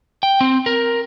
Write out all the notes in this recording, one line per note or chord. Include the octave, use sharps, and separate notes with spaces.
G5
C4
A#4